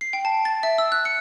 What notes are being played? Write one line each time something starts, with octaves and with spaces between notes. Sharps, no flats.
C7
G5
A5
A6
E5
E6
F#6
C#7